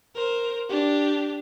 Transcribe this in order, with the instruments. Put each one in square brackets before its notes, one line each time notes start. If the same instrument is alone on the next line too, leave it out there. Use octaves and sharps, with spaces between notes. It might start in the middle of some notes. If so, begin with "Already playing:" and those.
[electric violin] A#4 C5
D4 G4